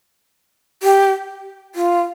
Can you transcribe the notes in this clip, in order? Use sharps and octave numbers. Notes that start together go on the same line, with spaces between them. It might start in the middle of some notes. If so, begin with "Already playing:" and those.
G4
F4